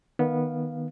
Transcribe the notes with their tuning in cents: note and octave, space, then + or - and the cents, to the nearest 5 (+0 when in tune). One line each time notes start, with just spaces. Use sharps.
D#3 +0 B3 -15 F5 +0